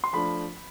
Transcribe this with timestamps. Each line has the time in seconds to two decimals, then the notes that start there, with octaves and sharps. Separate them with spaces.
0.04 C6
0.13 F3 A3 D4 B5